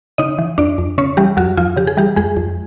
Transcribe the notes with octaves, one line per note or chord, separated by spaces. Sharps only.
C#3 D#4 D#5
E3
F2 D4 D5
F2
C#3 C#4 C#5
E3 G3 G4
F2 F#3 F#4
F2 F3 F4
C#3 G4
G#4
E3 G3 G4
F2 G#3 G#4
F2